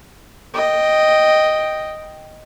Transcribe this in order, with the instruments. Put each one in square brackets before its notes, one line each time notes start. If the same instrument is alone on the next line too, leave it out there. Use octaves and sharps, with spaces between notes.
[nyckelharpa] D#5 G5